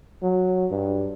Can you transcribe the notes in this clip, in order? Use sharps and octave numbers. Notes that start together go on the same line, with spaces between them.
F#3
G2